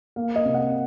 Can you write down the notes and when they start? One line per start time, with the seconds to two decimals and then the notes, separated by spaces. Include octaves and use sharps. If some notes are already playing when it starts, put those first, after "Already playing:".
0.16 A#3 F5
0.36 D#5
0.45 C3
0.54 F#5